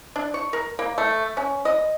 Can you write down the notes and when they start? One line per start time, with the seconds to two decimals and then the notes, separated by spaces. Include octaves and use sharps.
0.16 D4
0.34 C#6
0.53 A#4
0.79 A#3
0.98 A3
1.37 C#4
1.65 D#5